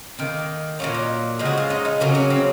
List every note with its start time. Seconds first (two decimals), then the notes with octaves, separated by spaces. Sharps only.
0.19 D#3 A#3 C4
0.79 A#2 F#3 A#3 C#4
0.94 D#4
1.39 C#3 F3 G#3
1.45 F#4
1.58 F4
1.70 D#4
1.85 D#4
2.00 C#3 F#3 A#3 C#4
2.15 C#4
2.30 C4